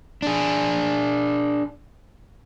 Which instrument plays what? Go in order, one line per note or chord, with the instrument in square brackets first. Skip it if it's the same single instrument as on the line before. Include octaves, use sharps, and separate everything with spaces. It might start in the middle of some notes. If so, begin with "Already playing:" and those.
[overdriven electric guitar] D4 G#4